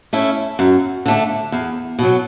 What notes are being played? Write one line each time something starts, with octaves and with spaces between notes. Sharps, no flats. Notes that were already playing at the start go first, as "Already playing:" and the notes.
A3 C#4 E4
F#2
D3 A3 D4
E2
B2 F#3